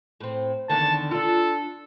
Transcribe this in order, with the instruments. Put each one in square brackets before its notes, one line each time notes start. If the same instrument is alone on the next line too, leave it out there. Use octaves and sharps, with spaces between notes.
[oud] A2 C4
[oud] E2 D3 D#3 [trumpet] A5
[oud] D4 F4 [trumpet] A4